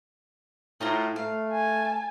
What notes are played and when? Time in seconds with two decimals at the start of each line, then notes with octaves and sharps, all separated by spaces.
0.81 A2 D#4 F4 A#5
1.16 A3 F5
1.52 G#5 A5